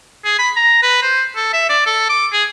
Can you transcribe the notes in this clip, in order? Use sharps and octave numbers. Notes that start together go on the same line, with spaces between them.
G#4
B5
A#5
B4
C5
A4
E5
D5
A4
D6
G#4